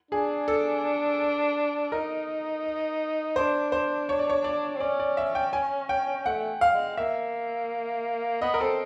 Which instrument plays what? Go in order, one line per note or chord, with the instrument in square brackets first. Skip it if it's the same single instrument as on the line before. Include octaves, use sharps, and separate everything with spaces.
[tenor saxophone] D4 [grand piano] G#4
[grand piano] A4
[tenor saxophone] D#4 [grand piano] A#4
[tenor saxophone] D4 [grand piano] C5
[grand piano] C5
C#5
D5
C#5
D5
[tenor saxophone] C4
[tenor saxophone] C#4 [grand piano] D5
[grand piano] D5
E5
G5
G#5
G5
[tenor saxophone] A3 [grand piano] F#5
[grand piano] F5
[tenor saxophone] G#3
[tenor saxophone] A#3 [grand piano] E5
[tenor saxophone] B3 [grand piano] D#5
[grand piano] A#4
[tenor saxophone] C4 [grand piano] A4